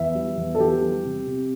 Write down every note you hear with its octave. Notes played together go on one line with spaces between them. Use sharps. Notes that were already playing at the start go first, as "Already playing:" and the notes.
Already playing: E2 E5
G3
E2
A4
E2 G4
G3
C3
C3